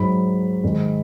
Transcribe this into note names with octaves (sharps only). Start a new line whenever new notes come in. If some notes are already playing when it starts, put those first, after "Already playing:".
Already playing: G#2 F#3 D#4 B5
G#2 D#3 G#3